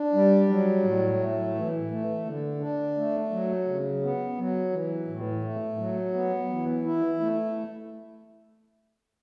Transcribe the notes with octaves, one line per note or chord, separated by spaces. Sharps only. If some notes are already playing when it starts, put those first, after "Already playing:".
Already playing: D4
G3
F#3
A2
A3
E3
A3
D3
D4
A3
F#3
C#3
B3
F#3
E3
A2
A3
F#3
B3
E3
E4
A3